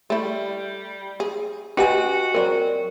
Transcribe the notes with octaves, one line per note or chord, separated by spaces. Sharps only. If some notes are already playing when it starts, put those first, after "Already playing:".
G3 A3 E4
G#4
C#4 F#4 G4 B4 D#5 F#5 G#5
F#3 C4 A#4 D5